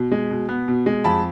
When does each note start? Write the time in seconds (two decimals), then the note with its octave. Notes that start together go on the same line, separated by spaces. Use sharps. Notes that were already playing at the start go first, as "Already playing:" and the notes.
Already playing: B2
0.12 G#3
0.31 B2
0.49 B3
0.68 B2
0.86 G#3
1.04 F2 A5 B5